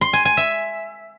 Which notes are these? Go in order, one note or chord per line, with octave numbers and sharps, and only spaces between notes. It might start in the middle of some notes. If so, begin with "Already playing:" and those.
C6
G#5
G#5
E5